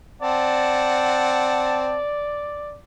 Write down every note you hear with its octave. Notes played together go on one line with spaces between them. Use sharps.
C4 D5 F#5 A5